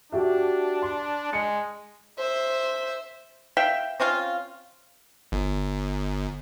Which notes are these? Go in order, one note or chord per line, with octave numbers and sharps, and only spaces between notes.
D4 F#4 G4 E5
C6
G#3 C#7
C5 E5
E5 F5 G5
C4 C#4 F4 F5
G1